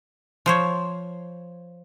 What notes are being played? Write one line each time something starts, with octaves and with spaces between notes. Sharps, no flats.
F3 C5 C#5